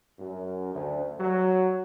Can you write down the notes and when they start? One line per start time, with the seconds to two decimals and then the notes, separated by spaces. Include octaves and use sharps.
0.19 F#2
0.73 D2
1.18 F#3